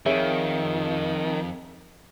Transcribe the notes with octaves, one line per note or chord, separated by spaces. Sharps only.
F2 D#3 G#4 C#5 E5